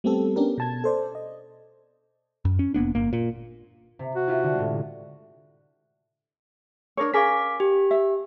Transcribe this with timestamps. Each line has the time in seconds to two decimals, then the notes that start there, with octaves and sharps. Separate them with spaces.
0.04 G3 A3 B3 C4 G4 A4
0.36 B3 C#4 D4 G4 A#4
0.58 B2 A5 G#6
0.84 A4 C5 D5
1.15 D#5
2.45 F#2
2.59 C#4
2.74 F1 A#3 B3 D4
2.95 G1 A#3
3.13 A#2
3.99 C3
4.15 F#4
4.27 E4 F4 G4
4.43 D3
4.54 A2 G#3
6.97 D4 A#4 C#5
7.14 C#4 G#4 A#4 F5 D6 B6
7.60 G4
7.91 E5